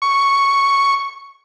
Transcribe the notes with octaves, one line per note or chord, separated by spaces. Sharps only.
C#6